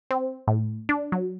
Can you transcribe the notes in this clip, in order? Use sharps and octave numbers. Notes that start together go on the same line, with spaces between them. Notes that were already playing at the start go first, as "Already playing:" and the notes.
C4
A2
D4
F#3